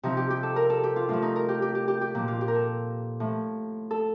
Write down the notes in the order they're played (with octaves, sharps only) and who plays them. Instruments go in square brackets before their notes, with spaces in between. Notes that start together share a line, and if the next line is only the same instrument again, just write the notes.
[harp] C3 F3 D#4
G4
G4
A4
A#4
A4
G4
F4
A2 F3 F4
D#4
A#4
G4
G4
G4
G4
G4
A#2 F3
F4
G4
A#4
A4
A2 F3
A4